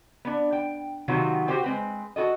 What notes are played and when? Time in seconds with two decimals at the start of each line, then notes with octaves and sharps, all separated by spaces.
0.25 B3 D4
0.52 G5
1.08 C3 D#3 F#3 B3 F4 F#4
1.48 F#4 G4 A4 C5 G5
1.64 G#3 C4 B4
2.16 F#4 A4 D#5